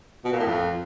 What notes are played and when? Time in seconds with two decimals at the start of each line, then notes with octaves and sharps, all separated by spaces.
0.25 B2
0.32 A#2
0.39 A2
0.47 F2